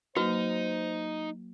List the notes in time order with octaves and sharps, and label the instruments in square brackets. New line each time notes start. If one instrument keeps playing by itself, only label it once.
[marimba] F#3 A#3 [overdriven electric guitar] D#4 [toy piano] F#4 B4 [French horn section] C5